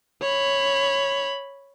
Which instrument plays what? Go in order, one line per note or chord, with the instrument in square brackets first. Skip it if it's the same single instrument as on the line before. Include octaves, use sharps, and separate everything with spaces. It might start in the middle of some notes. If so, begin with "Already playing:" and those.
[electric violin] C#5 B5